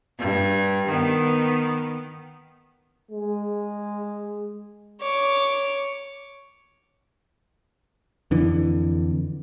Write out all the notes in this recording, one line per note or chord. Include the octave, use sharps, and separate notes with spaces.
G2
D#3 B3
G#3
C#5 D6
F2 D3 E3